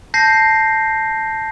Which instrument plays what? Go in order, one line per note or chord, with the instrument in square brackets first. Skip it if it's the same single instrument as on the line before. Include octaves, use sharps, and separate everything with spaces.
[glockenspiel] A5 G6 A#6 C7